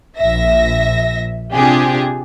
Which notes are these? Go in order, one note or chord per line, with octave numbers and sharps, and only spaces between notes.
A#1 E5 A#6
C3 D4 F4 G4 G#4